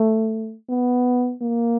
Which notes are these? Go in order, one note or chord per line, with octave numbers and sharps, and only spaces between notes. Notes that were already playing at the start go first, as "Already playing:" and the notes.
Already playing: A3
B3
A#3